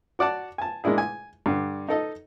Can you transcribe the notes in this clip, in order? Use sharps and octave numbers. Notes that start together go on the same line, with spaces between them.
F#4 D5 F#5 A5
G#5 A5
G#3 A#3 D4 E4 G#4
G#5
G2 D3
D#4 A4 D#5